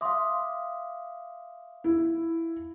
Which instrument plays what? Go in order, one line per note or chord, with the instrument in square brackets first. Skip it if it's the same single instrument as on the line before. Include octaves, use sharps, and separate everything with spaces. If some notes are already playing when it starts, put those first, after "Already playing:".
[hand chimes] E5 F5 [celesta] C6 D6 D#6
[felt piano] E4